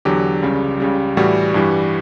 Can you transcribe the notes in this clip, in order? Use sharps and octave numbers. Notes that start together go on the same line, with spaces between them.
E2 D3 F#3 G4
C#2 C#3 G3
C#2 C#3 G3
A2 E3 G3 F#4
G2 E3 G3